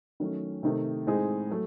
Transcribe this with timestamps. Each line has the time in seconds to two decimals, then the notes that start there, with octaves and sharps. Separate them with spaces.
0.20 D#3 F#3 A3 C#4
0.63 C3 D#3 A3
1.07 A2 G#3 C4 D#4 G#4
1.50 F#3 A3